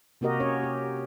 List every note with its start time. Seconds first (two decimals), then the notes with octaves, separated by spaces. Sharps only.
0.21 C3 A#3 F#4 G4 A#4 D#5
0.40 C#4 C#5
0.63 G4